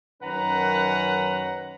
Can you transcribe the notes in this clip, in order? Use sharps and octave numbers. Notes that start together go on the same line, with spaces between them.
F#2 D#3 C#4 B4 F#5 A#5